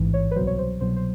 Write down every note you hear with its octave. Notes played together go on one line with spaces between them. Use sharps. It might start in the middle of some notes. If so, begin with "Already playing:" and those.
Already playing: A1 G#2 E3
C#5
B4
C2 B2 F#3 C5
C#5
C5
C2 B2 F#3 C5
C5